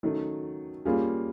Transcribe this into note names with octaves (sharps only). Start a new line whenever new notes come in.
D#3 F#3 A3 C#4
G3 A#3 C#4 F4 G#4